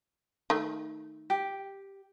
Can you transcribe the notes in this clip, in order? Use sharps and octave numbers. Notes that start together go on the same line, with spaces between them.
D#3 A3
G4